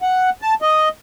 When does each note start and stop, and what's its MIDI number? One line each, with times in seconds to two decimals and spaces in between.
0.02 0.30 78
0.42 0.54 81
0.62 0.89 75